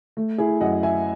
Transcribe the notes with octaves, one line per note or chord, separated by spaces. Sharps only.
A3
E4 G#4
F#2 D#5 F#5
E5 G#5